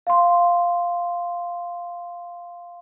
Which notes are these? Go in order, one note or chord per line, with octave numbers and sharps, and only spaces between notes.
F5 C6